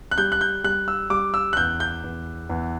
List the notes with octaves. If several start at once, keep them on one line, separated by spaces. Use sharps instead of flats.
F#6
G3 G6
F#6
G6
G3 F#6
E6
G3 D6
E6
F#6
E2 G6
G6
E2
E2